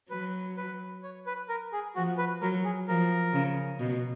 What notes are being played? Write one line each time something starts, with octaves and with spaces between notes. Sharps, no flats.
F#3 B4
B4
C#5
B4
A#4
G#4
F3 F#4
B4
F#3 A#4
G#4
F3 A#4
C#3
B2